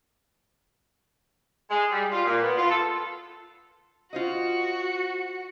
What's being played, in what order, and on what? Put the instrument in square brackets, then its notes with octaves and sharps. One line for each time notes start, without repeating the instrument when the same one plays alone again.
[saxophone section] G#3
G3
F4
A#2
B3
F4
A4
[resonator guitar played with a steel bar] F4 C5 D#5 [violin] F#4